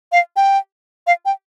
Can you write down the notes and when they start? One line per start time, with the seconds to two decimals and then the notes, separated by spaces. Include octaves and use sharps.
0.12 F5
0.36 G5
1.07 F5
1.25 G5